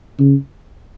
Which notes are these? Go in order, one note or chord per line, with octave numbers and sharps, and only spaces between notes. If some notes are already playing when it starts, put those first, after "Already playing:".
C#3